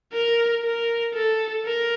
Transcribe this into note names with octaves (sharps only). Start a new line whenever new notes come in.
A#4
A#4
A4
A#4